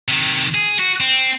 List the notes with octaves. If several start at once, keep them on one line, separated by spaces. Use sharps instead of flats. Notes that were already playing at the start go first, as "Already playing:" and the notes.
C3 D#3
G#4
F#4
C4